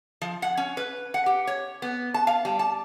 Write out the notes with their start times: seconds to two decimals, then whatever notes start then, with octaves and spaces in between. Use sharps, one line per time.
0.22 F3
0.42 F#5
0.57 C#4
0.77 B4
1.14 F#5
1.26 G4
1.47 C#5
1.82 B3
2.14 A5
2.27 F5
2.45 G3
2.59 A5